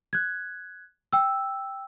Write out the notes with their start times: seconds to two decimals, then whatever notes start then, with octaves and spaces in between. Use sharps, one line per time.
0.13 F#6 G#6
1.13 G5 E6